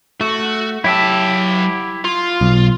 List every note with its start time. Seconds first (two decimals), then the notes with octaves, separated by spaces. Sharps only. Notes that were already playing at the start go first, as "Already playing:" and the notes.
0.21 A3 F#4
0.84 F#3 E4 G4 E5 A5
2.05 F4 C6
2.41 B1